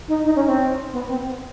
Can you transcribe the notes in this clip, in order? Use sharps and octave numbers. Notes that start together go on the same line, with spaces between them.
D#4
D#4
C#4
C4
B3
C4